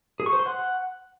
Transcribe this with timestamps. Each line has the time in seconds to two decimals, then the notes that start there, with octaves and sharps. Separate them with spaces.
0.20 G#4
0.26 C#6
0.33 C5
0.39 C6
0.46 F#5